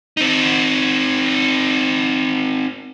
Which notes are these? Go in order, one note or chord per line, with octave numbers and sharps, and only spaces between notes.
C4 D#4